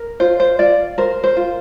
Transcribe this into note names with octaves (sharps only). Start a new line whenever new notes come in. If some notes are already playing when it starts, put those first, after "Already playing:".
Already playing: A#4
F4 C5
C5
F4 D5
A#4 C5
C5
F4